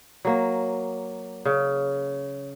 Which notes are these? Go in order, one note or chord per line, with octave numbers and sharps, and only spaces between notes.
F#3 A#3
C#3